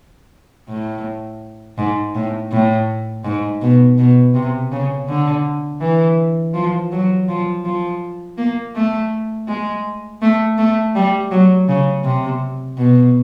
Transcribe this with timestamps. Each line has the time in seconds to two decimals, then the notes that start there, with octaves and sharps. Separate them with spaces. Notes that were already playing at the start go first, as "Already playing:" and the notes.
0.68 A2
1.78 G#2
2.15 A2
2.52 A2
3.25 G#2
3.62 B2
3.98 B2
4.34 C3
4.72 C#3
5.09 D3
5.81 E3
6.54 F3
6.92 F#3
7.29 F3
7.65 F3
8.38 A#3
8.75 A3
9.48 G#3
10.22 A3
10.58 A3
10.95 G3
11.31 F#3
11.69 C#3
12.05 C3
12.78 B2